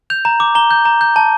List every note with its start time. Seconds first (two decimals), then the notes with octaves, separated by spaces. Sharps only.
0.10 G6 F7
0.25 A#5
0.40 D6
0.55 A#5 G7
0.71 G6
0.85 A#5
1.01 G6
1.16 A5